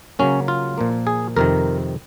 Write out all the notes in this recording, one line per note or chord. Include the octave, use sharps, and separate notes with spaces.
C#3 F#3 A#3 C#4
F4
A#2 F3 A#3
G#4
F2 C3 D#3 A#4